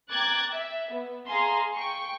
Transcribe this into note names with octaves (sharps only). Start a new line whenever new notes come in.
G5 A#5 D6 F#6 G#6 A6
E5
B3
G#4 F5 G#5 A#5 C6
G5 C#6